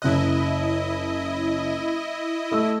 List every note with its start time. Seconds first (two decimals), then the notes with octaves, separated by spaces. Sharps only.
0.02 F#1 E4 D#5 F#6
2.52 A3 E6